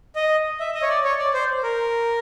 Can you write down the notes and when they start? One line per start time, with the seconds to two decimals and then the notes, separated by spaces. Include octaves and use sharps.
0.16 D#5
0.60 E5
0.75 D#5
0.82 C#5
0.89 D5
1.04 C#5
1.19 D5
1.34 C5
1.63 A#4